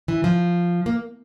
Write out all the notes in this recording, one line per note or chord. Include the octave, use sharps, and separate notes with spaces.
E3
F3
A#3